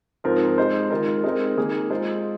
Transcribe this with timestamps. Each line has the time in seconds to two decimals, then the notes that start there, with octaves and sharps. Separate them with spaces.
0.24 G#2 F3 C4 F4 A#4
0.58 G#3 D#4 C5
0.90 D#3 G#3 F4 A#4
1.24 G#3 C4 D#4 A#4
1.57 D#3 A#3 G#4
1.90 G#3 F4 C5